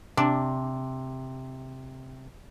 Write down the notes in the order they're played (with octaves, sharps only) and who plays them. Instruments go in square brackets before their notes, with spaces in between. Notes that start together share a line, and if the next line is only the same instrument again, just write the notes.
[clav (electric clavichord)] C3 [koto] D4